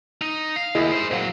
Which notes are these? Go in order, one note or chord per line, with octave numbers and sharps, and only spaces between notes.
D#4
F5
D#2 E4 G#4 D#5
D#4 C5
A#2 F#3 C5 F5